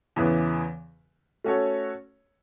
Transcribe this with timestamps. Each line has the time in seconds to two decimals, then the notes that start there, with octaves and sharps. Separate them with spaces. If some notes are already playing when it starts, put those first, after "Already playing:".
0.16 E2 C#3 E3 B3
1.44 A3 C#4 F#4 A4 C#5